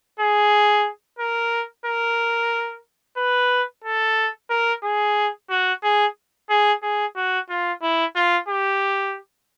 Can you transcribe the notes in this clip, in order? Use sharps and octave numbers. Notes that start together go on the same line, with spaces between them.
G#4
A#4
A#4
B4
A4
A#4
G#4
F#4
G#4
G#4
G#4
F#4
F4
E4
F4
G4